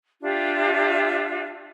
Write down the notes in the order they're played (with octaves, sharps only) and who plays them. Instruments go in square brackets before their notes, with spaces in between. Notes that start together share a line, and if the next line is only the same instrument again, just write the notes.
[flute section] D4 F4 G4 E5